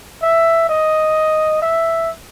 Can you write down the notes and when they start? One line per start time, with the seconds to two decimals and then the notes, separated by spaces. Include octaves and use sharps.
0.23 E5
0.69 D#5
1.62 E5